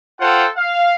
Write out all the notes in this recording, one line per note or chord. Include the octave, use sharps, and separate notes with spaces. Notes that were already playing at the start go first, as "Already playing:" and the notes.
F4 A4 C5 F#5 G5
F5